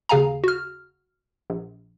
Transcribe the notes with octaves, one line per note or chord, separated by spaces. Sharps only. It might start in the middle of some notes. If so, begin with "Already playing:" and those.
D#2 C#3 G#4 F5 G#5 A#5
F#4 F6
A#1